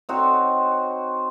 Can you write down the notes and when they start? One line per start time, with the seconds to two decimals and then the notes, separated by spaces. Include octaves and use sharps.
0.09 C4 D#4 F#4 C#5